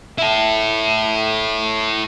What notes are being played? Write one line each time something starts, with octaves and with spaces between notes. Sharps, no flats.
E4 A4